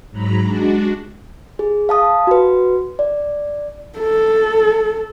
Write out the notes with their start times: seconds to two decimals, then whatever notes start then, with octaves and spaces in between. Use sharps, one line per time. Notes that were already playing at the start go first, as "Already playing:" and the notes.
0.11 G#2 F#3 A#5 B5
0.43 G#3 D4 F#4
1.59 G#4
1.89 F5 A5 D#6
2.27 F#4 B4
2.99 D5
3.98 A4